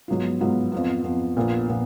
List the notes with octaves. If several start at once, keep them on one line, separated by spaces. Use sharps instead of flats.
G#2 F#3 B3 F4
G#2 F#3 B3 F4
F2 F3 B3
F2 F3 B3
A#1 A#2 F3 B3
A#2 F3 B3